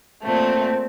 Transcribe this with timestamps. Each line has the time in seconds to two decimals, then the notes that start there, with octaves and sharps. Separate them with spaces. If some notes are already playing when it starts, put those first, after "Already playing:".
0.23 A#2 A3 C4